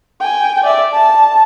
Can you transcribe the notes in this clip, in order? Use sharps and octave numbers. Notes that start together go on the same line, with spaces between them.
G5 G#5
D5 E5
A5